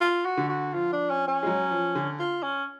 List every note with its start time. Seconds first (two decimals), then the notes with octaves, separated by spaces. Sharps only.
0.01 F4
0.25 F#4
0.37 D3
0.49 F#4
0.74 F3 F4
0.92 D4
1.10 C#4
1.28 C#4
1.43 G#3
1.47 F#3
1.71 F3
1.95 D3
2.20 F4
2.43 C#4